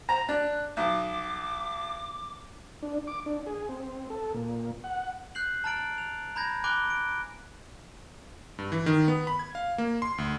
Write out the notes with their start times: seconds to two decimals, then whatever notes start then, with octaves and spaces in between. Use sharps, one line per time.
0.09 C5 A#5
0.29 D4 F#6
0.77 B1 D6
2.83 D4
3.07 D6
3.26 D4
3.47 G#4
3.69 C4
4.10 A4
4.34 A#2
4.84 F#5
5.35 F#6 G6 C7 F#7
5.64 A5 A#5 F6 A6 D7 F#7
5.98 F7
6.36 A#5 B5 G6 G#6 A#6
6.64 G#5 B5 D6 F#6 D7 G7
6.90 D7
8.59 G2
8.72 E3
8.86 D#3
9.08 B3
9.27 B5
9.39 G#6
9.55 F5
9.78 A#3
10.02 C6
10.18 D2